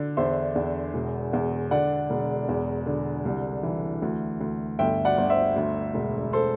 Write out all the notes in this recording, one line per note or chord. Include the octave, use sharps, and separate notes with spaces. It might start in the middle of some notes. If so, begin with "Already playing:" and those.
Already playing: D3
E2 C5 E5
E2
E1
E2
D3 D5 F#5
E1
E2
D3
C2
E3
D2
D2
G1 E5 G5
D5 F#5
G1
C5 E5
D2
E1
A4 C5